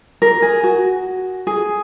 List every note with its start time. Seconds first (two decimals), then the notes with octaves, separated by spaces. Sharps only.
0.22 A#4
0.42 G#4
0.63 F#4
1.47 G#4